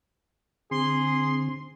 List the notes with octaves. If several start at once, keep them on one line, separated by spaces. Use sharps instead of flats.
D3 C4 G#4 C6